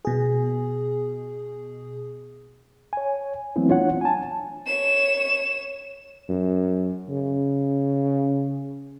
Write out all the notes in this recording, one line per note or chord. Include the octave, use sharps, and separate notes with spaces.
B2 G#4
C#5 G#5
E3 F#3 A3 B3 C4 E4
D4 F4 C#5 F#5
G#5 A5
C#5 E7
F#2
C#3